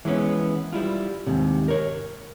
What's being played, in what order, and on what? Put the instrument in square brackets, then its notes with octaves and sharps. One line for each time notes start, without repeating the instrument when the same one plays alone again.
[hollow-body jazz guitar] E3 G#3 B3 C#4
G3 E4 F4
D#2 G#2 C3
A#4 C#5